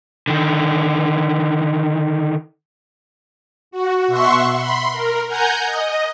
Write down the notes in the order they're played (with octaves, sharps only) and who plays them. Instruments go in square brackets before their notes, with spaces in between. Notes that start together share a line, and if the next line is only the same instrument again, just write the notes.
[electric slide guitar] D3 D#3
[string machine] F#4
B2 E5 F#5 C6 C#6
B5 C6
A#4
F#5 G#5 A#5 G6
D#5